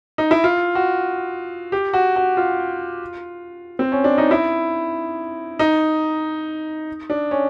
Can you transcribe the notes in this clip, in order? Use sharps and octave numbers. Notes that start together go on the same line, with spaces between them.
D#4
E4
F4
F#4
G4
F#4
F#4
F4
C4
C#4
D4
D#4
E4
D#4
D4
C#4